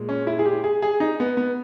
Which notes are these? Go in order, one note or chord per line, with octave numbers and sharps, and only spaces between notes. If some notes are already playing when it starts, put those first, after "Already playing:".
Already playing: A#2 G#3
C#4
E4
G#4
G4
G#4
G#4
D#4
B3
B3